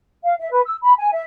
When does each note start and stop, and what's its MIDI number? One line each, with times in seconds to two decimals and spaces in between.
0.24 0.33 77
0.39 0.47 76
0.51 0.61 71
0.65 0.76 88
0.82 0.92 83
0.97 1.10 80
1.11 1.23 76